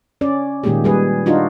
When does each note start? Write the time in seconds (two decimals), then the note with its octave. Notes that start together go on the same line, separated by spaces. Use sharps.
0.21 C#4 D5
0.64 A#2 D#3 G#3 A#3 G4 G#4
0.84 G3 G#4 B4
1.26 D4 D#4 F4 F#4